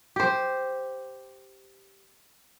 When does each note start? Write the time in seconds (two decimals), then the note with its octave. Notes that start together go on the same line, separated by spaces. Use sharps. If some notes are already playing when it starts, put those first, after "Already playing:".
0.16 G4 C5